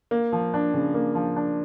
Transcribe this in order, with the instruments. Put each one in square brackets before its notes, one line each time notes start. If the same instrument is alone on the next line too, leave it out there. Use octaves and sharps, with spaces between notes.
[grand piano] A#3
F3
D4
C#3
A#3
F3
D4